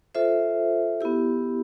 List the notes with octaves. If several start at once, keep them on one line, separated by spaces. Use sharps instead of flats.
F4 A4 C5 E5
B3 E4 G4